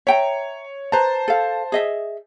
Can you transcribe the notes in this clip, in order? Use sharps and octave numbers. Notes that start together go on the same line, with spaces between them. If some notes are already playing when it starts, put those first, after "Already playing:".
C#5 E5 G5 A#5
B4 C5 A5 A#5
A4 F5
G#4 D#5 E5